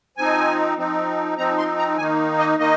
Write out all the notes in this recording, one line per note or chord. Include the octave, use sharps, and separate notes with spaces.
F3 C4 D#4 G#5
F3 C4 D#4
F3 C4 D#4 A#5
C6
A#5
D#3 A#3 D#4 G#5
D#5
D#3 A#3 D#4 D#5